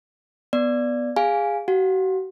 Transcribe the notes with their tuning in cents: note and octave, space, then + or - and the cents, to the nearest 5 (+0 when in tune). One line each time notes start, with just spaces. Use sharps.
B3 +0 D5 +0
G#4 -25 F5 +0 G#5 +0
F#4 +40 F5 +45